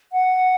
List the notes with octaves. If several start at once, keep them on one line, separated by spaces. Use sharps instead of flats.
F#5